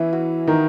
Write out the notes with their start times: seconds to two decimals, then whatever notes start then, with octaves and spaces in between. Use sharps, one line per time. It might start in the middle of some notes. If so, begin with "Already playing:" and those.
Already playing: E3 B3 C#4 E4
0.13 F#4
0.47 D#3 D#4